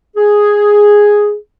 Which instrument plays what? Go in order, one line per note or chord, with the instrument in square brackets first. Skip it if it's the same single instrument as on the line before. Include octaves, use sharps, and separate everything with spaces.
[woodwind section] G#4